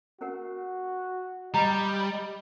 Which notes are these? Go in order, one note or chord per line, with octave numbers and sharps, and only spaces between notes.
C#4 F#4 A#4 F#5
G3 D#5 A#5